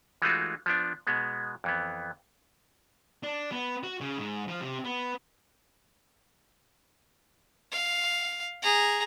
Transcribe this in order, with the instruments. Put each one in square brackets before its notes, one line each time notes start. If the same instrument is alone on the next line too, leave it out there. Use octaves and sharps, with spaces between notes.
[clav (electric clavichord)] E3 G#3 A3 D#4 F4 F#4
F3 B3 D4
B2 G#3 B3
F2 E3 B3
[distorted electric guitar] D4
B3
F#4
C#3
G#2
F3
C3
B3
[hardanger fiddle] F5
G#4 A#5